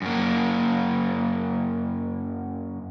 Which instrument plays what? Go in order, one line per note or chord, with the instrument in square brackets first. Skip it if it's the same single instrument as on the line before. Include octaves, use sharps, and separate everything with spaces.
[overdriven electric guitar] F#2 A#3